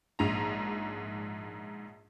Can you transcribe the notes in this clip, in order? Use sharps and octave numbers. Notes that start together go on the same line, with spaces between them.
A#1 G#2 A#5